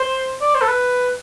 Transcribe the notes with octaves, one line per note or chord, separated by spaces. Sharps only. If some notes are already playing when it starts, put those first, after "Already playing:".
Already playing: C5
D5
C5
A4
B4